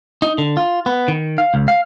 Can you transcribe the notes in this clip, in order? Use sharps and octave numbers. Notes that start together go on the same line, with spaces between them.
D#4
D3
F4
B3
D#3
F5
C#2
F5